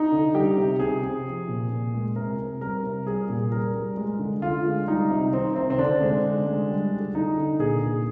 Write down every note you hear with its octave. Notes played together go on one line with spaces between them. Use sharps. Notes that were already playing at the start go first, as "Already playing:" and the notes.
Already playing: D#4
D3
G3 G4
C3
C3 G#4
C3
F3
A#2
A#2
G#3
C3 A#4
C3
G3 A#4
C3
G3 G#4
A#2
G3 A#4
G3
G#3
D3
D3 F4
G#3
G3 D#4
C3
D#3 C4
C3 C4
C4
D3 D4
G#3
D3
G#3
G3
D3
D3 D#4
D3
A#2 G#4
A#2